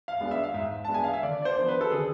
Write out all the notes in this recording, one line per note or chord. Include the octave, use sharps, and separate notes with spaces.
F5
G#3 B3 D4
E5
F5
G#2 E5
G#3 B3 D4 A5
G#5
F5
E5
D3 D5
D5
C5
F3 B3 D4
B4
A4
D3 G#4